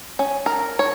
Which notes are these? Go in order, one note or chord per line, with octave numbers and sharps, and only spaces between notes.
C#4
A#4
C#5